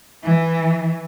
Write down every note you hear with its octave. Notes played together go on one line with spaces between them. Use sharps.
E3